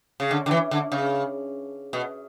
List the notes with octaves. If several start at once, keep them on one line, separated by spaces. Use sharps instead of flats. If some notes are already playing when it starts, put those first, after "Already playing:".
C#3
D3
D3
E3
D3
C#3
B2